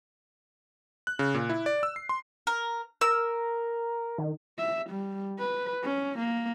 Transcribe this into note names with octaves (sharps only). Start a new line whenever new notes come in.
F#6
C#3
A#2
E4
D5
E6
C7
C6
A#4
A#4 E6
D#3
E5
G3
B4
C#4
A#3